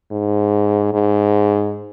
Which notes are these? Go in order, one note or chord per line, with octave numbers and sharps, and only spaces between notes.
G#2
G#2